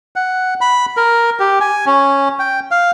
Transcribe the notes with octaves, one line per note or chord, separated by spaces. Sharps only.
F#5
B5
A#4
G4
G#5
C#4
G5
F5